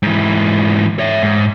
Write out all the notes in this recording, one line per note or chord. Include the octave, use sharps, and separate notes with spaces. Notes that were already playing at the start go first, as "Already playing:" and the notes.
G#2 E3
C#5 E5
G#2